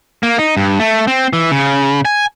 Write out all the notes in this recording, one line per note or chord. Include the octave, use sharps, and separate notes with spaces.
A#3
D#4
G2
A3
C4
E3
C#3
G#5